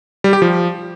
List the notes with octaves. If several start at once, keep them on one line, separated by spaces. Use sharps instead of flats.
G3
G4
F3